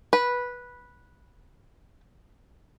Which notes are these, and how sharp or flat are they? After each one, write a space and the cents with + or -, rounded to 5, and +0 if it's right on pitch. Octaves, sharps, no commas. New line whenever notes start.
B4 -10